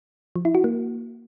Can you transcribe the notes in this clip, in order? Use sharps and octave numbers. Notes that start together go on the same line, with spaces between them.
F3
E4
F#4
A#3